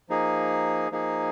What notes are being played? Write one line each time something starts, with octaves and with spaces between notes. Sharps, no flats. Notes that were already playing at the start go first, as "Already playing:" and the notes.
F3 A#3 D#4 G#4
F3 A#3 D#4 G#4